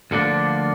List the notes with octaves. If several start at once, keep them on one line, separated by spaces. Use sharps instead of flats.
D2 D3 F3 A#3 D4